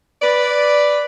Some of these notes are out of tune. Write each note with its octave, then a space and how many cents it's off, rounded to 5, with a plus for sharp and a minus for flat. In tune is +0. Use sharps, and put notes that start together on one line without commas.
B4 +0 D5 +0